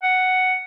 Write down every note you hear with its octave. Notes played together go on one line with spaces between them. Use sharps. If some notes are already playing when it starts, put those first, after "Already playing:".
F#5